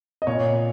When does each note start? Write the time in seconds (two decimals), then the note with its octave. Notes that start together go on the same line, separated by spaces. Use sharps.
0.22 D#5
0.27 A#2 C#5